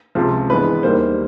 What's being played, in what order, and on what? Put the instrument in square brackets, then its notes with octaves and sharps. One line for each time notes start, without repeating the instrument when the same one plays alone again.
[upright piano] C#2 C3 F3
G2 E3 G#3 B3 B4
D#2 D#3 G3 A#3 C5